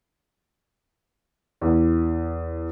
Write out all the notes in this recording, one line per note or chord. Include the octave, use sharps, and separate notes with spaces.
E2